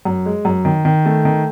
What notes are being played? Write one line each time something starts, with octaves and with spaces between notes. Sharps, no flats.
F#2
G#3
F#2
D#3
D#3
A3
D#3